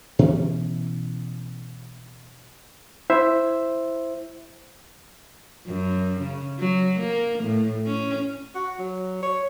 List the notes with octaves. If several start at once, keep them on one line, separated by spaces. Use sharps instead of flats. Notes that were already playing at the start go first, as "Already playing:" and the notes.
B2 E3 C#4
E4 C5 E5
F#2
C#3
F#3
A#3
A2
C#4
F#4
F#3
C#5